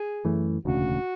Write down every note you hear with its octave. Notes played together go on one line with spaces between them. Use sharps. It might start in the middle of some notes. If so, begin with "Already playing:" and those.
Already playing: G#4
F#2 E3 A3
E1 D2 C#3 F#4